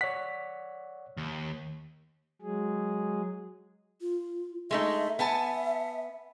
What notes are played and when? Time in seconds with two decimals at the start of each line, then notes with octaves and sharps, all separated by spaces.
0.01 C#5 D5 F#5 B6
1.17 D#2
2.42 F#3 G#3 G#4
4.01 F4
4.71 G#3 A3 D#4 E5
5.19 B3 E5 G#5 A5